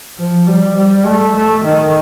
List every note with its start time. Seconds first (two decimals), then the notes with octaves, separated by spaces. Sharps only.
0.18 F3
0.47 G3
0.76 G3
1.06 A3
1.35 A3
1.65 D#3